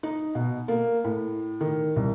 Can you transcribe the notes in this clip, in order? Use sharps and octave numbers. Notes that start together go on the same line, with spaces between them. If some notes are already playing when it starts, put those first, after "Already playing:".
D#4
B2
A#3
A2
D#3
C2